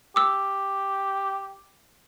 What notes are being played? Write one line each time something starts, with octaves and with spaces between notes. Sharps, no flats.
G4 D6 E6